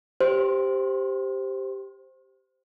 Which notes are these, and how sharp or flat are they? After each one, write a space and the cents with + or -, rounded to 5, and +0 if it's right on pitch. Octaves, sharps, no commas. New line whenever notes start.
G4 +0 C5 +0